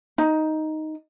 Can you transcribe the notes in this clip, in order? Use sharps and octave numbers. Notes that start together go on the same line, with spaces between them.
D#4